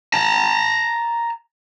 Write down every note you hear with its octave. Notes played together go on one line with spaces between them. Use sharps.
A5 A#5